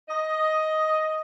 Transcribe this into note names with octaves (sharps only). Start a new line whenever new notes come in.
D#5